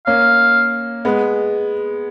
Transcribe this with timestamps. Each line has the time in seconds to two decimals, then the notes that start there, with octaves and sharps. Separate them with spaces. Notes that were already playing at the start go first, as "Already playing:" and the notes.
0.07 A#3 C#4 F5
1.05 G#3 B3